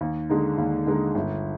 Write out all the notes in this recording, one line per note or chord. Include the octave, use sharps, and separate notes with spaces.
D#2
D3 G#3 D#4
D#2
D3 G#3 D#4
G1